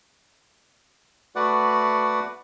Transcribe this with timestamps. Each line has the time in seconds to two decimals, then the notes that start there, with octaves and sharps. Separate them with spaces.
1.36 A3 F#4 B4 D5 F#5